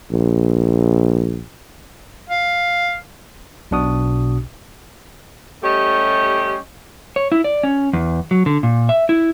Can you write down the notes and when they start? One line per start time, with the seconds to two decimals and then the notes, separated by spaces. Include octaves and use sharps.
0.11 A#1
2.29 F5
3.71 B1 B2 D4 F#4 D#6
5.63 G3 A3 C#4 G4 D#5
7.16 C#5
7.32 E4
7.44 D5
7.63 C#4
7.93 E2
8.31 F#3
8.46 D3
8.63 A#2
8.89 E5
9.09 E4